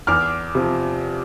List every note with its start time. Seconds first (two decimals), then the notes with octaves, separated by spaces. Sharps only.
0.07 E2 D6 F6
0.55 C3 F3